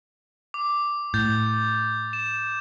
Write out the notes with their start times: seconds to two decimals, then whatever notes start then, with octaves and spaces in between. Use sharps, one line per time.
0.54 D6
1.14 A2 G6 A6
2.13 E7